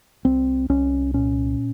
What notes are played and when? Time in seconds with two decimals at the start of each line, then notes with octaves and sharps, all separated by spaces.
0.25 C2 C4
0.69 C2 C#4
1.14 A#2 C#4